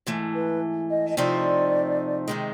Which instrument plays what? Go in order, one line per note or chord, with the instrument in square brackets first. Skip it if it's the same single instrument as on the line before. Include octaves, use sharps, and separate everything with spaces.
[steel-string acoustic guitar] G#2 E3 A3
[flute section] B4
D#5
D#5
[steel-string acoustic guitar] C3 F3 A3 C4 D#4 [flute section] D5
[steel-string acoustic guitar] C3 D#3 G#3 [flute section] D#5